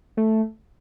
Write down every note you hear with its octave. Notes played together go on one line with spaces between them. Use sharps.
A3